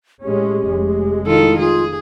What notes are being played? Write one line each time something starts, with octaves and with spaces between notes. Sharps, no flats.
A2 G#3 C#4 G4
F1 G#3
D#3 E4 F4 A4
F4 G#4